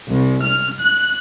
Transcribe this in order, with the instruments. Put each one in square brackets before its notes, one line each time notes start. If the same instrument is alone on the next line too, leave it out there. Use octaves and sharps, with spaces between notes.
[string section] C2
F6
F#6